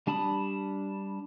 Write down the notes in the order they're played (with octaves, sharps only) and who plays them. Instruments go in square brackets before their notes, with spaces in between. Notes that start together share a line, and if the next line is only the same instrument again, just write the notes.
[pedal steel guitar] G3 D4 A5 B5 D#6